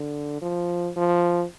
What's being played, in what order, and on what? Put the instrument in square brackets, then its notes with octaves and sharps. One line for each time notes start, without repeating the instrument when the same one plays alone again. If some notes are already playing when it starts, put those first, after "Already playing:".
Already playing: [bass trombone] D3
F3
F3